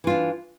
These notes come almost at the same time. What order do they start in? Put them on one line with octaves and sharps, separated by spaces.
E3 F4 D4